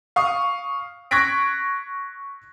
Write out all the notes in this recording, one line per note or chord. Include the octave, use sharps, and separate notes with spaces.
F5 C#6 D#6
C#6 F#6 G#6 A#6 B6 D7